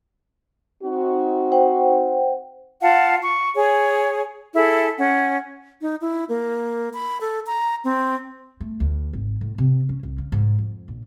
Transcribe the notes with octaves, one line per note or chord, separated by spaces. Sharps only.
C4 D#4 F#4
C5 F#5 G5
F4 F5 F#5 A5
C#6
G#4 C#5
E4 G#4 A4
C#4 F#5
D#4
E4
A#3
B5
A4
A#5
C4
A3
D2
G#1
A2
C3
C#4
C2
C#3
G#2
F2
A#1